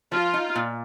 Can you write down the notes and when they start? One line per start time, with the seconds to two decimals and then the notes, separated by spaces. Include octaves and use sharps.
0.12 F3 F4
0.34 D#4
0.56 A#2